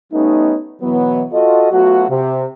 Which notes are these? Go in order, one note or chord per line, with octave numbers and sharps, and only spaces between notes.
G3 A3 B3 C#4 D#4
B2 E3 F#3 B3
F4 F#4 A4 D#5
F#3 A3 B3 F4 F#4
C3